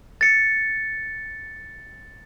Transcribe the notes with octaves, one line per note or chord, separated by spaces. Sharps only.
A6 C#7